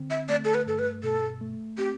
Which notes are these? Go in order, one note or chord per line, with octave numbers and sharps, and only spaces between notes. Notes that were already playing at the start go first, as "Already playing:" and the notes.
Already playing: D3 C4
E5
A3 D5
A4
B4
G2 A4
B4
B2 A4
A3
C4 G4